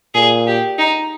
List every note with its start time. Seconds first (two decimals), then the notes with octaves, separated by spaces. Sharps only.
0.14 A#2 G#4
0.47 G4
0.78 D#4